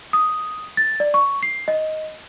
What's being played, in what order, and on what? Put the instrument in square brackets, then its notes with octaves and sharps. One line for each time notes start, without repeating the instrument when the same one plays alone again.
[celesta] D#6
A6
D5
C#6
C7
D#5